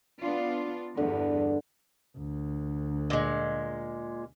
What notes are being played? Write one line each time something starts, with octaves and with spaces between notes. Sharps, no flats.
B3 D4 F4
E2 G2 D3
D2
A#2 G#3